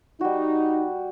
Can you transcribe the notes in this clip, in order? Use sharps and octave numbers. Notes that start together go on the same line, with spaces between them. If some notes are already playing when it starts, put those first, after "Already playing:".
G3 D#4 F#4